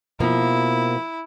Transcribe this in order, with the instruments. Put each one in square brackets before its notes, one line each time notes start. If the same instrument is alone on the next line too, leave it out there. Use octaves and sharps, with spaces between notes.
[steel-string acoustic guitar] B2 F3 A#3 [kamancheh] E4